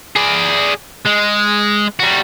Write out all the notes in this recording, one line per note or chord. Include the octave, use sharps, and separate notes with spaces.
G#4 D5
G#3
G3 F#4